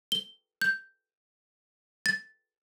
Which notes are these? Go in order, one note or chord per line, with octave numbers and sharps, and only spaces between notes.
G7
G6
A6